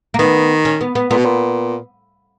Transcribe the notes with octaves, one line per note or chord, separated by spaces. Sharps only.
A#3
D#3 B3
C#4
B3
B3
A#2 B3
B2
A#2